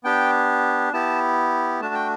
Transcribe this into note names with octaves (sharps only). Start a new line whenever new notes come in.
B3 D4 G4 G5
B3 E4 G4 A5
A3 D4 F#4 A5
G5